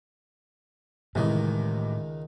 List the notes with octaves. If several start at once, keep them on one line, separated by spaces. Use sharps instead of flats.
C#2 A2 C3 D#3 E3 D#5